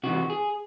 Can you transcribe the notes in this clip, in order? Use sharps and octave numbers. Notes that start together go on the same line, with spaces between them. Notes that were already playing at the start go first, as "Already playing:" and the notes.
C3 E3 F#4
G#4